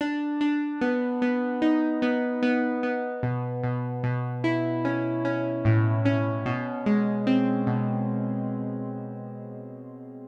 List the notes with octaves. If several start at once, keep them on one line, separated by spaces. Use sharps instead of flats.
D4
D4
B3
B3
D#4
B3
B3
B3
B2
B2
B2
E4
C#4
C#4
A2
C#4
B2
G#3
C4
B2